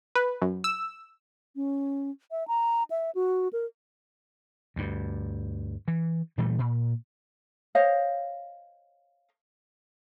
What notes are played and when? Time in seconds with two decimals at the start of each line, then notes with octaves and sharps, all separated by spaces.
0.15 B4
0.42 F#2
0.64 E6
1.56 C#4
2.31 E5
2.48 A#5
2.90 E5
3.15 F#4
3.53 A#4
4.76 D2 G2
5.88 E3
6.38 A#2 E3 G3 A3
6.59 A#2
7.75 C5 C#5 D#5 F5